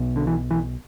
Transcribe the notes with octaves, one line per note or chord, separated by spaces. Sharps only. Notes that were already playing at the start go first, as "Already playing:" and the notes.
Already playing: B1 B2
D3
E3
E3